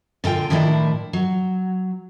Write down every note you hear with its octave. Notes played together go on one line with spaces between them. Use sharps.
A#2 D3 F4 G5
A2 D#3 F3 D4 E4
F#3